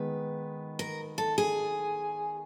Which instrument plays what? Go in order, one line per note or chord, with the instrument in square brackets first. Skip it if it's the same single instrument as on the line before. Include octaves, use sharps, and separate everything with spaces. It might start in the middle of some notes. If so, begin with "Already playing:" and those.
Already playing: [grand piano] D#3 G#3 B3 [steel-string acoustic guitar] B4
[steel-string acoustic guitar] A#4
A4
G#4